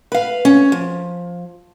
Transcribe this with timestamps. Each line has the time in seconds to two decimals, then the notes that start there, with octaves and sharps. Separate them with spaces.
0.12 B4 F5
0.45 C#4
0.72 F3